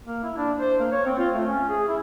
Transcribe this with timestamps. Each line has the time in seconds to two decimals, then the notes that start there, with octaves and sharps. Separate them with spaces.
0.07 A#3
0.23 E4
0.37 D4
0.59 C5
0.80 A#3
0.92 C#5
1.06 C4
1.18 F4
1.33 A3
1.47 C#4
1.69 G#4
1.88 E4